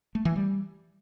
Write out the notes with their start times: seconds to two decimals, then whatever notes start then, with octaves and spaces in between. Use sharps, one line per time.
0.15 A3
0.25 E3
0.36 G3